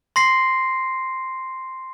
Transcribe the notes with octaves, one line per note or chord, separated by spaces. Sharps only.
C6 A#6 C7